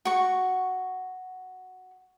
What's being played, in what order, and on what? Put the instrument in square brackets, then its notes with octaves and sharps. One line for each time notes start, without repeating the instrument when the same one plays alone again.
[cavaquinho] F#4 C#6